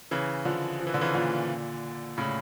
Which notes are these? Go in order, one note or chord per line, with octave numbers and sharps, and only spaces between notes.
C#3 E3
D3 F3
F3
E3
D3
C#3 E3
A#2 D3
A2 C#3